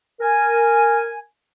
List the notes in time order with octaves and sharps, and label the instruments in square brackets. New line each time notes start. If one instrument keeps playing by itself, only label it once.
[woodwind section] A#4 G#5